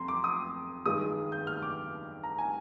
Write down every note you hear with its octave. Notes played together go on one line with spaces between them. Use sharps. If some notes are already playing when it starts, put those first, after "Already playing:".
Already playing: F2 A#5 C6
D6
D#6
G2 D#3 G#3 D#6
G6
F6
D6
A#5
G#5